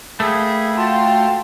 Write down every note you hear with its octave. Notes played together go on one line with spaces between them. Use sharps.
A3 A#3 G#4 G5 B5
F4 F#4 G5 A5 C6